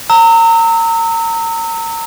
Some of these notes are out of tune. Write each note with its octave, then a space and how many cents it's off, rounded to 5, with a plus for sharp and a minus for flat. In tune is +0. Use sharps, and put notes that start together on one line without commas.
A#5 -30 E6 -30